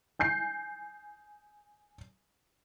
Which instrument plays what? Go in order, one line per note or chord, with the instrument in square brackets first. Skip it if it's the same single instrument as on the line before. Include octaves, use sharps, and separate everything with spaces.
[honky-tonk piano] G#5 G6 C7